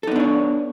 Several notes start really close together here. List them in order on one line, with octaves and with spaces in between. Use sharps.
A4 D#4 B3 D4 C#5